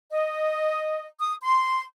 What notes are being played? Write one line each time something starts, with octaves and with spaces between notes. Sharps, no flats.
D#5
D#6
C6